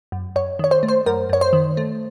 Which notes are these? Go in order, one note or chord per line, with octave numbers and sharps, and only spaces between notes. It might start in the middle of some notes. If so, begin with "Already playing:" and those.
F#2
F#2 C#5
D#3 C#5
C5
A3
C5
F#2 A#4
F#2 C#5
C5
D#3
A3